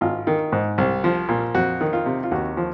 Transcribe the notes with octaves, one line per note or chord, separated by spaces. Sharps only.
G#1 F4
D#3
G#2
C2
F3
A#2
F2 F#4
D#3
F4
C3
F4
D#2 F#4
F3